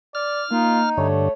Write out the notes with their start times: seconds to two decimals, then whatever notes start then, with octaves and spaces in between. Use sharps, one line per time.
0.15 D5 F6
0.51 A#3 D#4 F4
0.98 G2 D3 A3 C#5